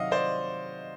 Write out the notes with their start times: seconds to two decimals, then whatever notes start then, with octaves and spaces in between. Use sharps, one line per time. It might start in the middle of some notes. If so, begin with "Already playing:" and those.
Already playing: C3 D#3 F#3 D#5 F5 F#5
0.11 C5 D5